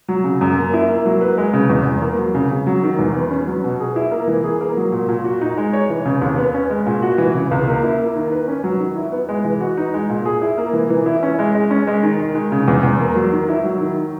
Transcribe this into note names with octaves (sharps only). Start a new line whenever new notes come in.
F#3
C#3
F#2
A#3
E4
A#3
F#3
B4
G#3
C#3
E2
E2
A#3
F#3
C#3
C#3
F#3
D#3
E2
B3
C#4
F#3
B2
G#4
E4
A#3
E3
G#4
A#3
F#3
A#2
A#2
F#4
D#4
G#3
C#5
E3
C#3
D#2
B3
C#4
G#3
A#2
F#4
E3
C#3
C#2
A#3
E4
A#3
D#3
B4
C#4
F#3
D#3
E4
B3
G#3
E3
F#4
D#4
G#3
A#2
G#4
E4
A#3
E3
E3
E4
C#4
G#3
G#3
C#4
G#3
D#3
D#3
G#3
C#3
E2
E2
A#3
F#3
D#3
E4
F#3
D#3